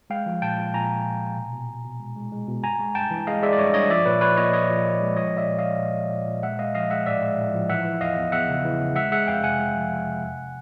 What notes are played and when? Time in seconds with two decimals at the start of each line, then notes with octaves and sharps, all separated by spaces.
0.10 G#3 F5 G5
0.26 F3
0.42 A#2 G5 A5
0.58 A#2
0.74 A#2 G#5 A#5
0.90 A#2
1.06 A#2
1.21 A#2
1.37 B2
1.53 B2
1.69 B2
1.85 B2
2.00 G#3
2.16 G#3
2.32 G#3
2.48 B2
2.64 G2 G#5 A#5
2.79 G#3
2.95 G2 G5 A5
3.10 E3
3.27 G#3 D#5 F5
3.42 G#3 D5 E5
3.53 D5
3.58 G2 C#5 D#5
3.74 G2 C#5 D#5
3.89 F3 D5 E5
4.06 A#2 B4 C#5
4.21 F3 B4 C#5
4.37 A#2 C#5 D#5
4.53 A#2 C#5 D#5
4.70 F3
4.85 F3
5.01 G#3
5.16 F3 C#5 D#5
5.33 A#2 D5 E5
5.48 A#2
5.59 A#2 D#5 F5
5.79 A#2
5.95 G#3
6.11 A#2
6.27 A#2
6.43 G#3 E5 F#5
6.59 G#3 D#5 F5
6.75 F3 D#5 F5
6.90 G#3 E5 F#5
7.06 A2 D5 E5
7.21 G#3
7.38 A2
7.54 F3
7.69 E3 E5 F#5
7.85 E3
8.01 E2 D#5 F5
8.17 E2
8.32 E2 E5 F#5
8.49 C#3
8.64 E3
8.80 C#3
8.96 G#3 E5 F#5
9.12 G#3 E5 F#5
9.28 F2 F5 G5
9.43 C3 F#5 G#5
9.59 G#3
9.75 F3
9.91 F3
10.07 C3
10.22 E2